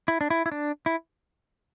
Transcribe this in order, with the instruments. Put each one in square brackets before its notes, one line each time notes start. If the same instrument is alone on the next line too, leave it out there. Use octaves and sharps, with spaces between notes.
[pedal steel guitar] E4
D4
E4
E4
D4
E4